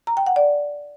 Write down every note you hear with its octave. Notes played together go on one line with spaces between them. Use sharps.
A#5
G5
F#5
D5